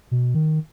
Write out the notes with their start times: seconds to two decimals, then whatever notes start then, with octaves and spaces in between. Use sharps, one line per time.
0.11 B2
0.35 D#3